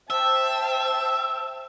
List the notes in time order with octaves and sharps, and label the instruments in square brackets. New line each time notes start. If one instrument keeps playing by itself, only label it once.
[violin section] C5 G5 A5 [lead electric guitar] E5